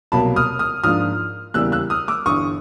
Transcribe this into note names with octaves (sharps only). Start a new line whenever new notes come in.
C2 B2 F#3 A#3 A5 B5
D#6 F6
D#6 F6
G#2 F3 A#3 D4 F4 D#6 F6
E2 C#3 E3 G3 A#3 E6 F#6
E6 F#6
D#6 F6
D6 E6
G1 G2 E3 C#6 D#6